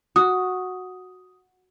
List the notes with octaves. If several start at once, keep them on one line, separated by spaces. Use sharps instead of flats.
F#4 D#6